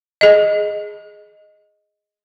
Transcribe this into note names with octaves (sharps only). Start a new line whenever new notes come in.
G#4 D#5